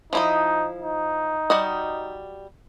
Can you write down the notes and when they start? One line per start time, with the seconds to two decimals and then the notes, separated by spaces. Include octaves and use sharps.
0.13 F3 D#4 E4 D#5
0.81 D#4
1.50 G3 F#4 D#5